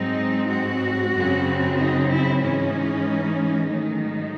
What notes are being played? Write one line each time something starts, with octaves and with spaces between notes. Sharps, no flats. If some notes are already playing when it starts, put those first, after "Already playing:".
Already playing: G#2 F#3 C4 D#4
F#4
F#2 C#3 F#3 C4
D#4
E4
G#2 E3 G#3 C#4 D#4
G#2 D#3 F#3 A3 D#4